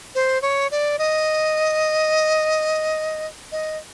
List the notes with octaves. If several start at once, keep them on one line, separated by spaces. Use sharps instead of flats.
C5
C#5
D5
D#5
D#5